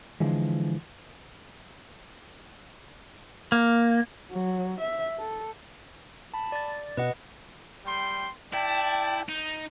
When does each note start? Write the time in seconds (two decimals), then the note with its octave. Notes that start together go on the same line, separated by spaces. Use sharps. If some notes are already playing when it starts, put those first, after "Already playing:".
0.20 D3 E3 F3 G#3
3.52 A#3
4.32 F#3
4.81 E5
5.19 A4
6.34 A5 B5
6.52 D5 A6
6.97 B2 B4 D#5 F#5
7.86 G3 G5 C6
8.53 E4 D5 G5 A5
9.29 D#4